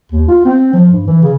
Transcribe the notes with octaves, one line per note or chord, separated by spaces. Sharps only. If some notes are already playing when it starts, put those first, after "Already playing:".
D#2
F4
C4
F3
G2
E3
C#3